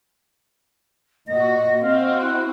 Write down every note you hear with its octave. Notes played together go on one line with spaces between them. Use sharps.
A#2 F#4 D#5 A#6
C4 F#4 F5
E4 F#6